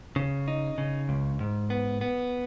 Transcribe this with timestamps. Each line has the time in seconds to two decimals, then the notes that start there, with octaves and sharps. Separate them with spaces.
0.16 C#3
0.48 D#4
0.78 C#3
1.09 C#2
1.40 G#2
1.70 B3
2.01 B3